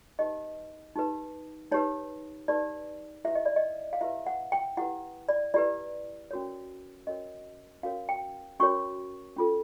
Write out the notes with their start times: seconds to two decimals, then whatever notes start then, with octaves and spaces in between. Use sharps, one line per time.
0.19 D#4 G4 B4 D#5
0.96 D#4 G4 B4
1.72 D#4 G4 B4 C#5
2.48 D#4 G4 B4 D5
3.25 E4 G4 B4 E5
3.35 D#5
3.46 D5
3.56 D#5
3.93 F5
4.01 E4 G4 B4 E5
4.27 F#5
4.52 G5
4.77 E4 G4 B4 F#5
5.29 D5
5.54 E4 G4 B4 D5
6.31 C#4 F#4 A#4 C#5
7.07 C#4 F#4 A#4 C#5 D#5
7.83 C#4 F#4 A#4 C#5 F5
8.09 G5
8.60 C#4 F#4 A#4 C#5 C#6
9.36 C#4 F4 A4